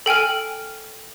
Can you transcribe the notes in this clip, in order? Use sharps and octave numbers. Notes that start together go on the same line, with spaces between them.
A4 G5 G#5 F6